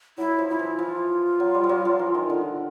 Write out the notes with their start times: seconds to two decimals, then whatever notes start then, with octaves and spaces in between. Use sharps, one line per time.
0.18 F#3 E4
0.38 F3
0.49 F3 E4
0.59 E3
0.79 F3 F4
1.40 F#3
1.55 G3
1.64 F3
1.69 F#3
1.85 F3
1.99 E3
2.15 D#3
2.30 D3